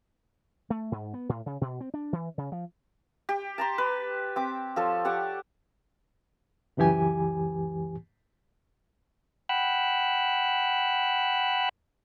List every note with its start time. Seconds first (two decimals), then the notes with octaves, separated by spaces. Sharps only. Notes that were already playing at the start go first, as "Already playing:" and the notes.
0.70 A3
0.92 G#2
1.14 B3
1.29 A2
1.46 C#3
1.61 B2
1.81 C4
1.94 D4
2.13 E3
2.38 C#3
2.52 F3
3.29 G4
3.58 A5 A#5 C6
3.78 B4
4.36 C4 D6
4.76 F3 A4 C#5
5.05 G4 D5 F#5 C#6
6.77 C#2 F#2 E3 G4 G#5
9.49 F#5 G5 B5 E6 F#6